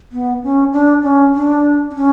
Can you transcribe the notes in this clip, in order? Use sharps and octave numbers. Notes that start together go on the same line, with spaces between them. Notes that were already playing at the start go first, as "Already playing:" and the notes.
B3
C#4
D4
C#4
D4
D4
C#4